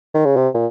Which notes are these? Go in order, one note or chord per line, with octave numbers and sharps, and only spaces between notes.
D#3
C#3
C3
A#2